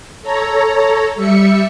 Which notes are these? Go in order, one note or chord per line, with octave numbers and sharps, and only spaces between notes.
A4 C#5 A#5
G3 E5 C#7